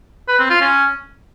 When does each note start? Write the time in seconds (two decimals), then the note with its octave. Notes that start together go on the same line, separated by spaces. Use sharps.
0.28 B4
0.39 C4
0.50 F4
0.61 C#4